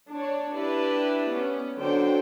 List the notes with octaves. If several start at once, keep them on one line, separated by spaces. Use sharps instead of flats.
D4 C#5
D4 E4 G4 B4 D5
B3 C#4
D3 F#3 D4 C5 C#5 G5